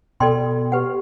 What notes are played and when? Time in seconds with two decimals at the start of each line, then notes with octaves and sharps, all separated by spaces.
0.20 B2 A4 D5 G5 C6
0.72 G4 B4 F#5